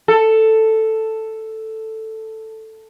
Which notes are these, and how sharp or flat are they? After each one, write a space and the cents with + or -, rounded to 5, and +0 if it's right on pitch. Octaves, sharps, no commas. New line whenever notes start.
A4 +5